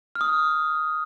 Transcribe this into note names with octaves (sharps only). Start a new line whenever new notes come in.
F6
D#6